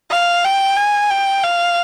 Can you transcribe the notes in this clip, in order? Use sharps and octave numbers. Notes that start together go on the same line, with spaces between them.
F5
G5
G#5
G5
F5